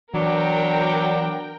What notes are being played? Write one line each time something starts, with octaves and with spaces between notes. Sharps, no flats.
E3 F#3 B3 D4 A#4 G5